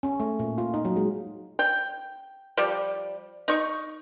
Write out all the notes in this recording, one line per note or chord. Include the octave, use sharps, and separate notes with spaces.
C#4
A3
A#2
F4
D#4
F#3
G#3
G5
F3 G3
D#4 C#6